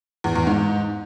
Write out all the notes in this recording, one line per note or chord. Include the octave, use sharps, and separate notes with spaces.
E2
E2
G#2